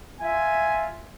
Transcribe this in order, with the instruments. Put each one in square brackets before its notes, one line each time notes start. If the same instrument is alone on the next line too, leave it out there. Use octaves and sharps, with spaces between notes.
[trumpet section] F4 G#5 [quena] E5